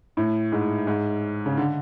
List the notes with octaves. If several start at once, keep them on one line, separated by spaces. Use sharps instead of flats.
A2
G#2
G#2
C#3
D3